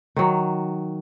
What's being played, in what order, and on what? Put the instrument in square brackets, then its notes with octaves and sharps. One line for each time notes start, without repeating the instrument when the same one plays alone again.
[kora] D#3 F#3